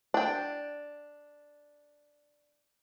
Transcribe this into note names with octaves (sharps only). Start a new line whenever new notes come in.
D4 G5